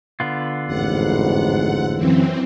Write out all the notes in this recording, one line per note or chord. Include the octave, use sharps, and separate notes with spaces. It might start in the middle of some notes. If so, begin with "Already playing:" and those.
D3 B3 F4
A1 F2 G#2 F#5
F#2 E3 C4